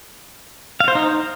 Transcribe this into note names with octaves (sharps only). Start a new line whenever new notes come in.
F5
C5
D#4